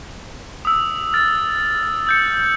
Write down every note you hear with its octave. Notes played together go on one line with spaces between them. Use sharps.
D#6 E6
F6 A6
E6 G6 C#7